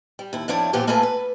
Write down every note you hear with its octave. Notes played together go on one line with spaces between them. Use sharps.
G3
D#2 E4
F2 F3 D4 E4 C#5
A#2 E3 F3 B3 G4
A3 A#3 F4 A4 B4 G#5
B4